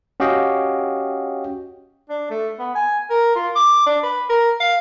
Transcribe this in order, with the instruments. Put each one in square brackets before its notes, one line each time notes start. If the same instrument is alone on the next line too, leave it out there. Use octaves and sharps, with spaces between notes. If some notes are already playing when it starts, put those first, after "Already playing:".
[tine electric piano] C#4 F#4 G4 D#5 F5 G5
[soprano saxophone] D4
A3
B3
G#5
A#4
F4
D6
D4
B4
A#4
F5